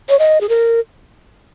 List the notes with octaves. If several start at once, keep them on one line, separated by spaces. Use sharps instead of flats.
C#5
D#5
G#4
A#4